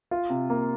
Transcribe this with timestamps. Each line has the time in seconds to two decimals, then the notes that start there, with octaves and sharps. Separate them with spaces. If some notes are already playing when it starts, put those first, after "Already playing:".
0.11 F4
0.30 C3
0.50 A#3